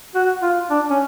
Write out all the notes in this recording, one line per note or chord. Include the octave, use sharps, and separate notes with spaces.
F#4
F4
D4
C#4